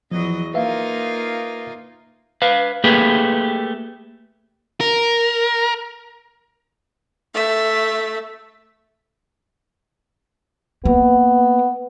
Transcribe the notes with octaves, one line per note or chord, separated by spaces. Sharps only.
E2 F3 F#3 D#5
A#3 D#4 F4 B4 E5 F5
B4 F5
A3 A#3 G4 G#4 B4
A#4
A3 E5
A#3 B3